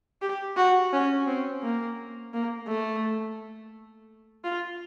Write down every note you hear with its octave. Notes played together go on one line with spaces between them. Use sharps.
G4
F#4
C#4
C4
A#3
A#3
A3
F4